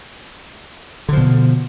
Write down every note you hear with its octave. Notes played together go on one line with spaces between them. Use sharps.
B2 D3 F3